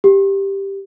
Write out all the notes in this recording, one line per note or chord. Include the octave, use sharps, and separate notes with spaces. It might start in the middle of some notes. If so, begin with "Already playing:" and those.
G4